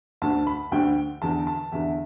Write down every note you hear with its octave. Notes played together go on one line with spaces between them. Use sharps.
D2 D3 A5
B5
D2 D3 G5
E2 D3 A5
A5
E2 D3 E5